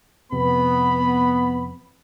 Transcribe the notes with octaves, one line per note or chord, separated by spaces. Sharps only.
F2 C3 B3 B5